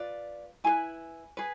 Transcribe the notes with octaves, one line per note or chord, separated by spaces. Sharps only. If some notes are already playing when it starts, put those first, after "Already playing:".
Already playing: F4 B4 D5
E4 G#4 B4 G#5 B5
G#4 B4